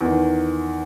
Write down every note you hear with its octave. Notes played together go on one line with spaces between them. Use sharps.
E2 D#3